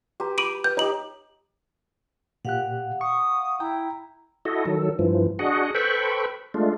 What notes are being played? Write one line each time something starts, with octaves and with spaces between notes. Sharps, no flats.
F#4 G4 B4 A#5
F4 B5 D6 D7 D#7 F#7
B4 G5 G6
D#4 F4 G4 C#5 F#7
A#2 G4 F5 F#5 F#6
C#6 D#6
E4 G5 A#5
E4 F#4 A4 D#5
D#3 F#3 A4
G2 E3 F3
D4 F#4 G#4 D#5 F#5
A4 B4 C5 G5 B5 C#6
G#3 A3 D4 F4